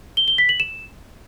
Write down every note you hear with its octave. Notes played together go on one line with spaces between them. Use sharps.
G7
G7
B6
F#7
E7